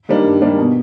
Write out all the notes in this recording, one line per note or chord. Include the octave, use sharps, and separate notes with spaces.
D#3 G3 A#3 D4
G2
D#3 G3 A#3 D4
B2